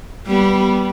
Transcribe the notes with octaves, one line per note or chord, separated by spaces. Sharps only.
G3 B3